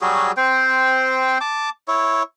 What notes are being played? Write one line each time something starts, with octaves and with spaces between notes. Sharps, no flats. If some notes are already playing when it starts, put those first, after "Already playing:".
F#3 G3 F#4 G#4
C4 C5 G5
A5 D6
E4 C#5